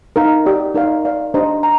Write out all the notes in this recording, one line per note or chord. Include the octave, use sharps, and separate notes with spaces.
D#4 A#4 F5 A#5
G4 A#4 D5
D#4 A#4 D5 F5
A#4 D5 F5
D4 G4 C5 D#5 A#5
A#5